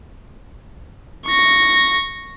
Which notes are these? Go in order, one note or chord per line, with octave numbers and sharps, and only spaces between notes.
C#6 A#6